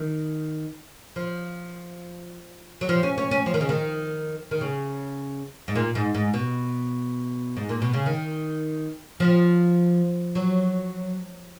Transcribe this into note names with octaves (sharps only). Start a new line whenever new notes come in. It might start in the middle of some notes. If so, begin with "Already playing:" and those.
Already playing: D#3
F3
F#3
F3
C#4
C#4
C#4
F3
D#3
C#3
D#3
D#3
C#3
G#2
A#2
G#2
G#2
B2
G#2
A#2
B2
C#3
D#3
F3
F#3